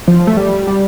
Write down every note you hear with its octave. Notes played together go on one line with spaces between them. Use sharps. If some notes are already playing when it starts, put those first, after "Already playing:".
F3
A3
G3
G3